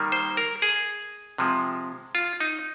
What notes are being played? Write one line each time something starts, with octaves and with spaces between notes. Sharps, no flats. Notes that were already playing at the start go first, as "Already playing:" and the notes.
Already playing: D#3 G3 A#3
C5
A#4
G#4
C3 F3 G#3
F4
D#4